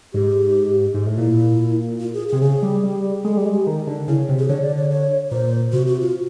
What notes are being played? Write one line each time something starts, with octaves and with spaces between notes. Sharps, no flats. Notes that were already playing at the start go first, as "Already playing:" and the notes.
G#2 G4
G#2
A2
A#2 E4
F4
G#4
C3 G#4
C#3 G#4
G3
G3
G#3 A4
G3 G#4
G#3
G4
D#3
D3
C#3 E4
C3
G#4
D3 C#5
D5
C#5
C#5
A#2 C5
C3 F#4
F#4
F4